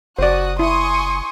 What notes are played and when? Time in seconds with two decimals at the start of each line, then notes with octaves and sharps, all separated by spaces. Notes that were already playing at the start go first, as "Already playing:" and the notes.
0.19 F#1 F#4 C5 D5 D#6 F#6
0.59 E4 G#5 C6 C#6 D#6